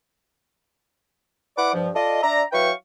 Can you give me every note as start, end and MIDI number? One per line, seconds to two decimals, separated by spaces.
1.57 1.72 64
1.57 1.72 71
1.57 1.72 74
1.57 1.72 78
1.57 1.72 86
1.73 1.89 43
1.73 1.89 53
1.95 2.22 65
1.95 2.22 69
1.95 2.22 74
1.95 2.22 75
2.23 2.43 62
2.23 2.43 74
2.23 2.43 76
2.23 2.43 82
2.52 2.71 54
2.52 2.71 64
2.52 2.71 71
2.52 2.71 77
2.52 2.71 79
2.52 2.71 85